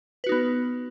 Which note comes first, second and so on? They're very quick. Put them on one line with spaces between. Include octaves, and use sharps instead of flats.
B4 F#4 D#4 B3